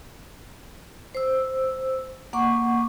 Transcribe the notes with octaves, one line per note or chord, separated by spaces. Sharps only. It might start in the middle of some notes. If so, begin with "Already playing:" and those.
C5 E6
A#3 F#5 C#6 D6